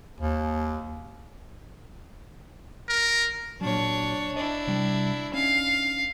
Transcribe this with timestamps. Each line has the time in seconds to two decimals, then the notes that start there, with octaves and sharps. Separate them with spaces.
0.20 D#2
2.89 A#4
3.61 A#2 F#3 D4 C#5
4.36 D4 E4 D5 D#5
4.67 C3 G3
5.34 C#4 D#4 F5